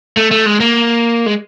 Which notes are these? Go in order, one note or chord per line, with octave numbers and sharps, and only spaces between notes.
A3
A3
G#3
A#3
G#3